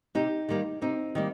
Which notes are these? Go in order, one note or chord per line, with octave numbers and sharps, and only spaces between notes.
C3 D#4 G4
D#3 G3 A#3
C3 C4 D#4
D#3 G3 A#3